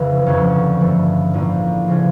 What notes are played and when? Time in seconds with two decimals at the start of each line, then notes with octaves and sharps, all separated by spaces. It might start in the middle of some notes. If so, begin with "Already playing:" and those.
Already playing: F1 F2 C#3 E3
0.26 G1 F2 D3 F3 C#4
0.80 G2 F3 A3
1.33 A#1 A2 F3
1.88 C#3 F3 C#4